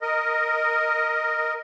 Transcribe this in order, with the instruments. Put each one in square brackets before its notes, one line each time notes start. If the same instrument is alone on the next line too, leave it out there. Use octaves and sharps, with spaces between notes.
[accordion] A#4 D#5